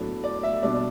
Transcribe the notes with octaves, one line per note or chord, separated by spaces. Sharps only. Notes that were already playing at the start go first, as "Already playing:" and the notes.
Already playing: A2 F#3 B3 D4
D5
E5
B2 G3 D4 D5